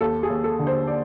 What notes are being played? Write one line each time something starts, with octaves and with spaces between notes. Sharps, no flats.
D#2 A4
G#4
D#2
A4
D3
C5
D5